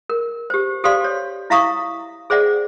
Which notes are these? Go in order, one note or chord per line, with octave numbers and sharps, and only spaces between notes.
A#4
G4 C5
G4 A4 C5 D5 F5 C6
C#5
E4 E5 F5 A#5 C#6 D#6
G#4 C5 D5 E5 F#5